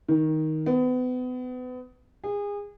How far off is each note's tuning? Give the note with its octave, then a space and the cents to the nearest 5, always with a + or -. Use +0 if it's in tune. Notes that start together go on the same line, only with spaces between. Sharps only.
D#3 +10
B3 +35
G#4 -30